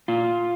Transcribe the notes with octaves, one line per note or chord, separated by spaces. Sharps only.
A#2 F4